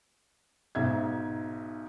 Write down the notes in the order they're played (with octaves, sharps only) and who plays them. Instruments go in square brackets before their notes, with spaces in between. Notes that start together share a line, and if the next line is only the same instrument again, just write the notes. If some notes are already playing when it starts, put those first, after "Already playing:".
[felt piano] B1 G#2 E5 G#6